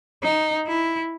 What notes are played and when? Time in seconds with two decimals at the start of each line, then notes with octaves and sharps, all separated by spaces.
0.23 D#4
0.67 E4